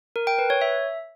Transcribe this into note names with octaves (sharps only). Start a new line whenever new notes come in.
A#4
G5
B4
C#5
E5